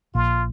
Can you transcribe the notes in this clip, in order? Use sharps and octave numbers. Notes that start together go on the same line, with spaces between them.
A#1 A#2 F4